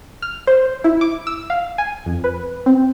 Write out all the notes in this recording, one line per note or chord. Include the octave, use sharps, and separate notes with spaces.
F6
C5
E4
D6
E6
F5
G#5
F2
B4
C4